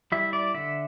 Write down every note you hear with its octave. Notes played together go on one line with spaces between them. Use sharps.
G3 E4 E5
D5
D3 E5